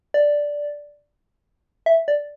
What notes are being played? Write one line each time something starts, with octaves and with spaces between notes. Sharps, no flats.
D5
E5
D5